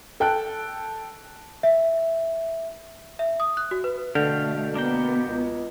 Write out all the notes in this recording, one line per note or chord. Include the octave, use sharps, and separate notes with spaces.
A4 G5 A5 F#6
E5
E5
D#6
F#6
F#4
B4
B2 D3 A3 F5 G5
A#3 B3 D4 A#4 G5
C#2